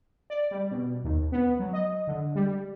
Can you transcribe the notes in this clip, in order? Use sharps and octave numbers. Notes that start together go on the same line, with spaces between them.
D5
G3
B2
D#2
B3
F#3
D#5
D3
G3